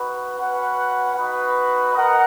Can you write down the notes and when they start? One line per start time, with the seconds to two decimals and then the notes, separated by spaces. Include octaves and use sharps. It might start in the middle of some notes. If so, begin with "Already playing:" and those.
Already playing: D#4 F#4 B4
0.38 C#4 F#4 B4 F#5
1.15 D#4 F#4 B4
1.92 D#4 A#4 D#5 F#5